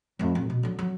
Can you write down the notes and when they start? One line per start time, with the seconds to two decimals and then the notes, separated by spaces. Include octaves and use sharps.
0.19 F2 A3
0.35 A1
0.50 B2
0.63 D3 F#3
0.79 F#3